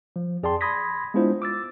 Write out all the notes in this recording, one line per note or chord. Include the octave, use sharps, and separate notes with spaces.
F3
F2 G#4 D5 G5 A5 C6
B5 C6 D#6 G#6 A#6 B6
G#3 B3 D4 E4 F4 C5
D6 E6 A6